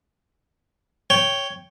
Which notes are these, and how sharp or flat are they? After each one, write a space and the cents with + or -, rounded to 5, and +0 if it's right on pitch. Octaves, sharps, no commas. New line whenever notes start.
C#5 +0 G5 +0